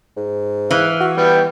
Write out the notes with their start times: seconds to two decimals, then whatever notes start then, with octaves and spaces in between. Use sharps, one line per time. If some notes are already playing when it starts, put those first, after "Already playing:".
0.17 G#2
0.71 E3 F5
1.01 F#4
1.17 G3 B3 B4 G5